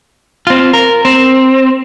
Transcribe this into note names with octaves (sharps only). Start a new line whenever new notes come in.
C4 F4
A#4
C4